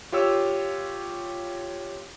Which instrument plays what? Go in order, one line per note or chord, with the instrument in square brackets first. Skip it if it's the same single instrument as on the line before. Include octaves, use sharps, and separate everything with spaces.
[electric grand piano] F4 G4 C#5 E6